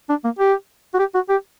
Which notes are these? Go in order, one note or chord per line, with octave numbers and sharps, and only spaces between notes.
D4
A#3
G4
F#4
G4
F#4
G4